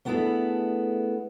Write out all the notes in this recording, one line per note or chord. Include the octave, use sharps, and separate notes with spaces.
A3 B3 D4 E4 G#4 A4